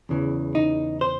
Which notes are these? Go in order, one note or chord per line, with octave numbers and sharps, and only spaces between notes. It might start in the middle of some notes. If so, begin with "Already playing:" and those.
E2 C#3 E3
D#4
C5